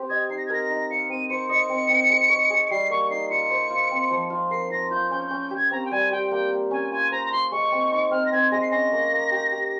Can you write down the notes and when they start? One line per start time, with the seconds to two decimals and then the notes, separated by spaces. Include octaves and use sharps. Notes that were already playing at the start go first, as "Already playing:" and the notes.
Already playing: C4 G4
0.09 D#5 G#6
0.29 D#4 C7
0.37 A#6
0.46 G#6
0.50 A#4 A#6
0.70 D#4
0.90 F5 C#7
1.09 C4 D#7
1.29 C5 C#7
1.49 D#5 C#7
1.69 C4
1.89 C4
2.10 G#3
2.30 C#5
2.50 G#4
2.66 C#7
2.70 G3 C7
2.90 A#3 C#6
3.10 D#4 C7
3.30 F4 C#7
3.50 C5
3.70 F4
3.91 C4
4.11 F3
4.30 F4
4.51 A#4 C7
4.71 F4 A#6
4.90 F4 G6
5.10 C#4 G6
5.26 C#4 G6
5.40 G6
5.51 G4
5.56 G#6
5.71 C4 A#5
5.84 G5
5.91 G3 G#5
6.11 G4 G5
6.31 A#3 G5
6.51 A#3
6.71 C#4 G#5
6.91 F4 G#5
7.11 C5 A#5
7.25 A#5
7.31 F4 C6
7.51 G#3 C#6
7.72 C4
7.91 D#4
8.11 C4 F6
8.26 A#6
8.32 C4 G#6
8.51 G#3 A#6
8.61 C7
8.71 C#4 A#6
8.92 A#3
9.12 A#3
9.31 G4
9.52 G4